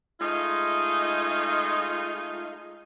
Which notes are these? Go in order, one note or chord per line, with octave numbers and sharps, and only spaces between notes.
G#3 A3 D#4 F4